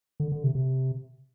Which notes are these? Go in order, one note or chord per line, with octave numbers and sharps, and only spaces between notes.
D3
D3
C3
C3